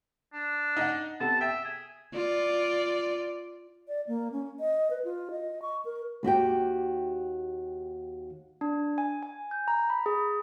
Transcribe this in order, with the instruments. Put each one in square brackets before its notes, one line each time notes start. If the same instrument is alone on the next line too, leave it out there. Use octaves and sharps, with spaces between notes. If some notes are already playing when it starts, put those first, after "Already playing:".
[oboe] D4
[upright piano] D#4 D#5 F#5
[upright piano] C3 B3 A4 [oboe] A5
[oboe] E5 [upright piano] G5
[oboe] G#4
[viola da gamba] F4 D5
[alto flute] D5
A#3
C#4
D#5
B4
F4
D#5
C#6
A#4
[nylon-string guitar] D#2 F#4 G4 G5
[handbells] D4
G#5
G#5
G6
A#5
B5
G#4